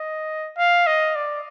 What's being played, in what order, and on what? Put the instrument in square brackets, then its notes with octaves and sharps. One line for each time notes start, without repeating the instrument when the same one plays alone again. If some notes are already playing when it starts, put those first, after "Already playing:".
Already playing: [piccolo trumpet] D#5
F5
D#5
D5